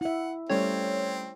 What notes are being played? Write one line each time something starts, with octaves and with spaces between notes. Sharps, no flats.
E4 E5 F#5
G3 A3 C4 C#4 C#5